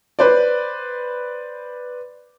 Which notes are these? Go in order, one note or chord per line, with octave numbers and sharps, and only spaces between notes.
B4 C5 D5